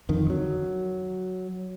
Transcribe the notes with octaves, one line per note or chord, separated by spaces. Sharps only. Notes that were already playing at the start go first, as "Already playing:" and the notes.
F2 D3 D#3
F#3